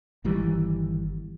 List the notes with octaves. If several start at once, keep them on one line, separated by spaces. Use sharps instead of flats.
G1 D#3 E3 G3